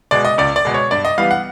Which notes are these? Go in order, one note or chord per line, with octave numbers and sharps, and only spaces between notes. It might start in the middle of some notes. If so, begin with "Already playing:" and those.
B2 G#3 D5
D#5
C#2 D5
D5
B2 G#3
C#5
G2 D5
D#5
E3 G3 B3 F5
F#5